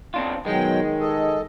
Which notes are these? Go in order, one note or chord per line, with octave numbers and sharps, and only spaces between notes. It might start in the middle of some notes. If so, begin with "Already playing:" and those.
C4 D4 F4
B2 D#3 F#3 G#3 G5
A4 D#5